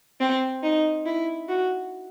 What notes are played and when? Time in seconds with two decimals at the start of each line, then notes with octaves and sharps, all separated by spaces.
0.20 C4
0.63 D#4
1.06 E4
1.48 F#4